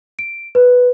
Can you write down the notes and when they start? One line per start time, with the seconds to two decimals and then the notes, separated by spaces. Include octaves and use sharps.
0.19 D7
0.55 B4